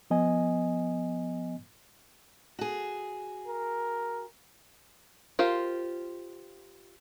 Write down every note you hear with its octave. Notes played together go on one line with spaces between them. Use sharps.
F3 B3 D#5 G#5
F#4 G#4
A#4
F4 G4 A#4 C5 F5